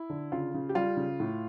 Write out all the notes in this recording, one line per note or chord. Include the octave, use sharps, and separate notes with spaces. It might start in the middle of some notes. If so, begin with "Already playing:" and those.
Already playing: E4
D3
C#3 F4
C#3
G4
G3 F4
C#3
A2